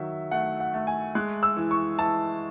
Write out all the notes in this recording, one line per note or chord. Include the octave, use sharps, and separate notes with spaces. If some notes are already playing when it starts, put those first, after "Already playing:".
Already playing: D#3 F#3 E5
A3 F#5
F#5
A3
G#5
G#3 F#6
E6
E3
C#6
E3 A5